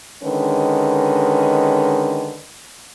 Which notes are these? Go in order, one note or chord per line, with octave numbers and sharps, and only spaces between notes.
D3 D#3 G#3 C#4 B4